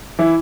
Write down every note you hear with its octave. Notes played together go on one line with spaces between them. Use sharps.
E3 E4